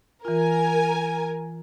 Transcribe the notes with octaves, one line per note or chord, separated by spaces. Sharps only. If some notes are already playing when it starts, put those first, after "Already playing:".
E3 F4 A#4 G#5